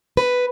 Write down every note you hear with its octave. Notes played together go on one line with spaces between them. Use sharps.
B4